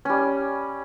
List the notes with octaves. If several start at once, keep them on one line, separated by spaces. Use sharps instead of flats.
G3 C#4